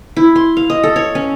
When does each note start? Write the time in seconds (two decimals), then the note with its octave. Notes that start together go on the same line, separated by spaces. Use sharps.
0.17 E4
0.36 C6
0.57 F5
0.70 D#5
0.83 A4
0.96 C#5
1.15 C#4